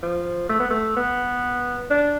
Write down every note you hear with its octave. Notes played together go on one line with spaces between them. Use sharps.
F3
A3
B3
A3
B3
D4